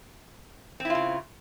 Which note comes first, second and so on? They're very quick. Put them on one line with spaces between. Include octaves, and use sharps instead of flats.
C4 E4 F4 C#3